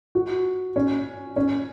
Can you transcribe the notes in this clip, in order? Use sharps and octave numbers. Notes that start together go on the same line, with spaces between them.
F#4
C#4
C#4